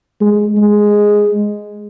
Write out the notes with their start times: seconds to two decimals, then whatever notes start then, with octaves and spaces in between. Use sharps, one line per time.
0.21 G#3
0.57 G#3